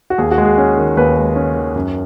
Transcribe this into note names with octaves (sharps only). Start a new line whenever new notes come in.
F#4
D#2 G#4
F#4
G#3
G#4
C#4
D#3
D#2 B4
G#3
C#4
D#3
F#2